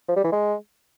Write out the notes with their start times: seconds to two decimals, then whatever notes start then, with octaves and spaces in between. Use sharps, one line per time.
0.08 F3
0.16 G3
0.24 E3
0.32 G#3